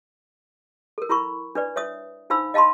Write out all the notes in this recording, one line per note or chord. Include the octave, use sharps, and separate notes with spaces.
A4 A#4
E4 A#4 B5 C#6
D4 B4 D5
C#5 E5 D#6
D4 D#4 C5 F5 B5 E6
D#5 F5 A5 B5 C6